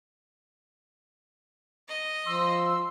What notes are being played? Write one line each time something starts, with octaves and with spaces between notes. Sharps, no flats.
D#5
F3 C6 E6